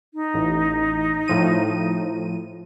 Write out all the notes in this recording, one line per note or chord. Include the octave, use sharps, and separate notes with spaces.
D#4
A1
A2 F3 D#7